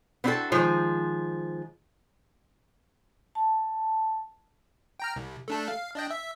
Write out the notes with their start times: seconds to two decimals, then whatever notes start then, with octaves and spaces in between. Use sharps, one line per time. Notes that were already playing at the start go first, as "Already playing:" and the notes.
0.24 B3 C4 D4 E4 F#4 A4
0.52 D#3 F3 G#3
3.35 A5
5.00 G5 A#5 F6
5.16 C2
5.48 A3 D4 A4
5.68 F5
5.95 D4 D#5 G5
6.11 E5